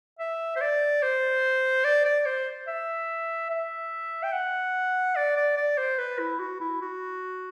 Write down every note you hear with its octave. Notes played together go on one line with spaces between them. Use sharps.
E5
C5
D5
C5
D5
D5
C5
E5
E5
G5
F#5
D5
D5
D5
C5
B4
E4
F#4
E4
F#4